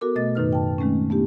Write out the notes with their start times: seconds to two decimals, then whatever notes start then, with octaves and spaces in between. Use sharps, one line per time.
0.01 B3 F#4 A4 A#4 D6
0.16 B2 A3 D#5 A6
0.35 F#2 A2 D#3 D#4 B4 F6
0.53 G5 A5
0.78 D#3 G#3 A3 C4 C#4
1.10 A3 B3 D4 E4 G4